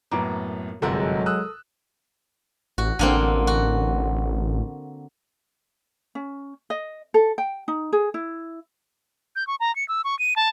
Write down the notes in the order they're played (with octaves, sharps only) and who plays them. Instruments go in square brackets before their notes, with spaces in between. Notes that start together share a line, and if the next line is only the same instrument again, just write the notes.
[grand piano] F#2 A2 B3 [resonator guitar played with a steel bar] A#3
[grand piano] G1 F#2 C3 [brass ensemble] F#3 G#3 [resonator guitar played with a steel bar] A4 A#4 F#5
[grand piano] D#6 E6 F#6
[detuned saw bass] A1 [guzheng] F#4
[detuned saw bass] A1 [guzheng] D3 A#3 C4
[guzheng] F#4
[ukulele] C#4
D#5
A4
G5
D#4
G#4
E4
[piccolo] G6
C#6
A#5
C#7
E6
C#6
D#7
A5